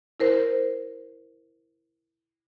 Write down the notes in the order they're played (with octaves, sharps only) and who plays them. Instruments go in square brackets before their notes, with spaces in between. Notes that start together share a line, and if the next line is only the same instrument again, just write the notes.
[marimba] E4 A#4 C5